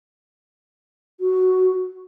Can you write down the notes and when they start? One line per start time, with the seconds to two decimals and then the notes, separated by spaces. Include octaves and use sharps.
1.20 F#4